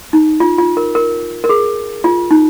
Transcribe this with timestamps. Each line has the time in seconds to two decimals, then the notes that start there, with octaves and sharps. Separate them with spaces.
0.13 D#4
0.40 F4
0.58 F4
0.77 A#4
0.95 A#4
1.44 A#4
1.49 G#4
2.04 F4
2.31 D#4